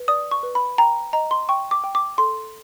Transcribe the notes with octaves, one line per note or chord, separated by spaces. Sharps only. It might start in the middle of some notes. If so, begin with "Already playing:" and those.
Already playing: B4
D5 D#6
C#6
B4
B5
G5 A#5
D#5 A#5
C6
G5 C#6
D6
G5
D6
A4 C6